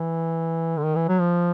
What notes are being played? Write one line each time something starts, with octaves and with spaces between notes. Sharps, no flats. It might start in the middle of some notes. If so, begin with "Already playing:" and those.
Already playing: E3
D3
D#3
E3
F#3
F3